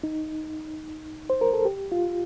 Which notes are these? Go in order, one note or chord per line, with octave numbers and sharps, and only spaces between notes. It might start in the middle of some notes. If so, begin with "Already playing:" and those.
D#4
C5
A#4
A4
G4
F4